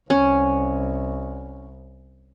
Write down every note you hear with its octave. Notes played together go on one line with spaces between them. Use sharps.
C2 C#4